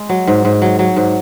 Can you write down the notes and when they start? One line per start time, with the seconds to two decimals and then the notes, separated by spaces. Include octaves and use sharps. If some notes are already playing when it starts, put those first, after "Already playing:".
Already playing: G#3
0.09 F#3
0.27 G#2
0.45 G#2
0.62 F#3
0.79 F#3
0.96 G#2